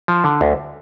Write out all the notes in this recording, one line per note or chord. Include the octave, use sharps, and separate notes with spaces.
F3
D3
D2